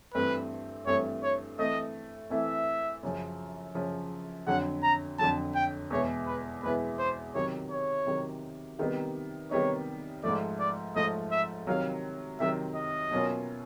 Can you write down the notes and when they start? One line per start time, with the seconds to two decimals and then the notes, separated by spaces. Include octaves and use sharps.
0.14 G2 E3 A3 C4 B4
0.86 G2 E3 A3 C4 C#5
1.23 C#5
1.58 E3 A3 C4 E4 D#5
2.30 E3 A3 C4 E4 E5
3.03 F#2 C#3 F3
3.75 F#2 C#3 F3
4.47 F2 D3 F#3 F#5
4.83 A#5
5.19 F2 D3 F#3 A5
5.54 G5
5.90 E2 B2 G#3 B3 E4 C#5
6.27 B4
6.63 E2 B2 G#3 B3 E4 B4
6.99 C5
7.35 C3 D#3 F#3 C#5
7.71 C#5
8.06 C3 D#3 F#3
8.79 C3 D#3 G3 B3 D#4
9.51 C3 D#3 G3 B3 D#4 C#5
10.23 G#2 F3 A3 D5
10.59 D5
10.96 G#2 F3 A3 D#5
11.31 E5
11.67 C3 D#3 F#3 F5
12.39 C3 D#3 F#3 E5
12.76 D#5
13.11 B2 F#3 A#3 C#4 F4